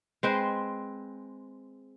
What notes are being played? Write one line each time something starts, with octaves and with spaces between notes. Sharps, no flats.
G#3 C4 B4 C5